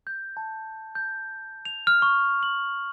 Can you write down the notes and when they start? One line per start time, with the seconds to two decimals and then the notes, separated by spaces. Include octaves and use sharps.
0.07 G6
0.37 A5
0.95 G6
1.65 F7
1.87 F6
2.02 C#6
2.43 F#7